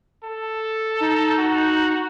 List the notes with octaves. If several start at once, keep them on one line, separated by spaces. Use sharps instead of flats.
A4
D#4
F#4